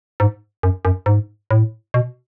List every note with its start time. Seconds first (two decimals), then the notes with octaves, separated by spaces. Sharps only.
0.20 G#2
0.63 F#2
0.85 F#2
1.06 G#2
1.51 A2
1.94 B2